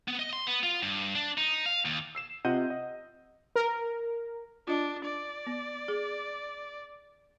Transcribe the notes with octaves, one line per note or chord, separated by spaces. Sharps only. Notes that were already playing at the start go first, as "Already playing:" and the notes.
B3
D#5
C6
B3
F4
G2
D4
D#4
F5
D#2
E6 C7 E7
C3 F4 D#5 F#5 G6 D#7
D#5
A#4
D4 F4 D#5 A5
D5
B3
G#4